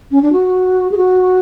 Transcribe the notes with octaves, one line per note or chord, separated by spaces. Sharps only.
C#4
D4
F#4
G#4
F#4